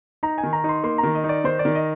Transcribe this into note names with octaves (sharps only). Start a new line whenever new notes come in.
D#4 A#5
G#5
D#3
A#5
D#4 C6
A#3 C6
A#5
D#3
D#5
D#4
D5
D#3 C5
D5
D#3
D#5